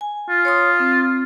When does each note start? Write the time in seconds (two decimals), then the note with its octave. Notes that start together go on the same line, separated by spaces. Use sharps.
0.01 G#5
0.29 F4
0.45 C#5 C6 D#6
0.80 C4